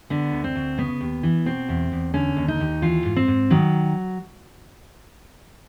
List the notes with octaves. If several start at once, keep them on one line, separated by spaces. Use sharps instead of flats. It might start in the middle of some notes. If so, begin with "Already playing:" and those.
D3 B3
D2
C4
D2
C#3 B3
D#2
E3
B2 C4
E2
E2
D3 C#4
D#2
D#4
D#2
E3 F4
G#2
C4
G#2
D#3 F#3